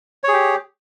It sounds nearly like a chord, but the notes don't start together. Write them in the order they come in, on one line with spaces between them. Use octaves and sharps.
C#5 G#4 G4